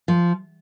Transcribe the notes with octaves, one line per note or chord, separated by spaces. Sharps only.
F3